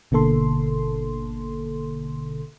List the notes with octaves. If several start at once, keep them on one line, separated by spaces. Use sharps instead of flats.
G#1 B2 D3 A#3 A4 C6